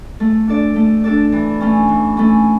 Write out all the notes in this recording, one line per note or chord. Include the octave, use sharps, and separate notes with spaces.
A3
D4 A4 D5
A3
D4 A4 D5
E3
A3 C#4
E3
A3 C#4